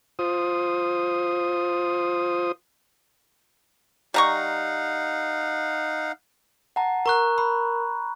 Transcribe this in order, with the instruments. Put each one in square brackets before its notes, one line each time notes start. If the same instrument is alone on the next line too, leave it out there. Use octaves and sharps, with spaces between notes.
[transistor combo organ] F4 C5 D#6
[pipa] G3 A#5 C#6 [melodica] D#4 F5 F#5
[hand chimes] F#5 A5 A#5
[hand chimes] A#4 [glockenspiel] A#5 C#6 F#6
[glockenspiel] B5